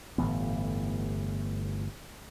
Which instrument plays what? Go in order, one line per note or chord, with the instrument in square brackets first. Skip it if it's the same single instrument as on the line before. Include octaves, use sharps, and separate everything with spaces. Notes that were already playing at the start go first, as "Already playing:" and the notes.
[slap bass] G1 A2 E3 B3